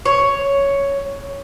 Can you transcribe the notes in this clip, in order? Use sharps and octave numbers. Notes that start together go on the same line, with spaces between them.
C#5